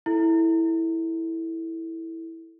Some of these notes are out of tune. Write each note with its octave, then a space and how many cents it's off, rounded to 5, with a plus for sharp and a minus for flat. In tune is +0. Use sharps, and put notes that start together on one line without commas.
E4 -10 A4 +0